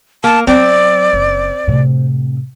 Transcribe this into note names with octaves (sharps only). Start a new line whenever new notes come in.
A#3 A5
F#3 C4 D5
F#1
A2 C3